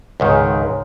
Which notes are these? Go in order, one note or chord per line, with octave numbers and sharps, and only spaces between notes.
C#2 G#2 D#3